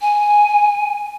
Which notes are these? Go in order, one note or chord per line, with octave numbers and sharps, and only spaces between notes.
G#5